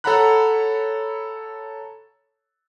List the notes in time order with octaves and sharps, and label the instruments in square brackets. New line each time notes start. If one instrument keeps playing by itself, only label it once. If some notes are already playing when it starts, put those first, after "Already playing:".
[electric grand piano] A4 C#5 F#5 A#5 B5 F#6